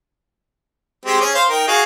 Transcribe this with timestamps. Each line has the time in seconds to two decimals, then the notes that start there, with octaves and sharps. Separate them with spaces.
1.06 G#3 C4 G4
1.21 C#4 G#4
1.35 C5 F5
1.49 D#4 A#4 G5
1.68 F#4 G#4 F5